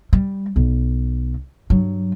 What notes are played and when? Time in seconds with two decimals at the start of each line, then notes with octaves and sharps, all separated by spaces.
0.13 G3
0.56 B1
1.70 G2 F#3